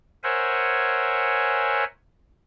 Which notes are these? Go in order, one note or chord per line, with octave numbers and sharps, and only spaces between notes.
A#4 C5 C#5 E5 F#5 G#5